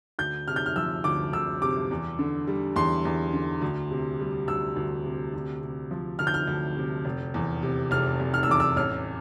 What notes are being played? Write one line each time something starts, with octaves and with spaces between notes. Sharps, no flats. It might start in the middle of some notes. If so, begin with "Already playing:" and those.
D2 G6
C3 F6
G6
F6
F3 E6
D2 D6
D2 E6
C3 D6
E2
D3
G3
E2 C6
E2
D3
D2
C3
G3
D2 E6
D2
C3
D2
C3
F3
D2 F6
G6
F6
D2
C3
F1
E2
C3
F1 F6
F1
F6
E6
E2 D6
E6
A1 F6